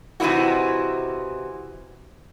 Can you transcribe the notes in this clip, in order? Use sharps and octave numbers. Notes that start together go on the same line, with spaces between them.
C3 E3 C4 D#4 E4 F#4